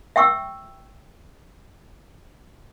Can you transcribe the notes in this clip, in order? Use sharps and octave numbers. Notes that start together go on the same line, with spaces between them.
E5 G5 C#6 E6